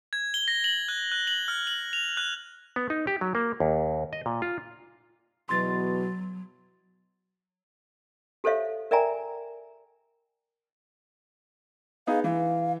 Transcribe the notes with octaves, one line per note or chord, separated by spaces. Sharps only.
G#6
G7
A#6
F#7
F#6
F#6
F#7
F6
F#7
F7
F#6
B3
D#4
G4
F#3
A#3
D#2
D#5
A#2
F4
E2 B2 F#3 C6 A6
G4 A4 C5 C#5 E5 F5
A#4 D5 E5 G5 G#5 A#5
B3 D#4 G#4 F5
E3 F5